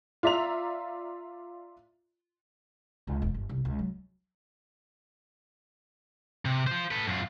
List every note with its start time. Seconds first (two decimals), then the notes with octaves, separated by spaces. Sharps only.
0.23 F4 D5 E5 A#5 F7
3.07 C#2
3.22 E1
3.34 G1
3.49 C2
3.65 C#2
3.79 F#3
6.45 C3
6.67 F4 C5
6.91 A4 B4
7.06 F#2 F4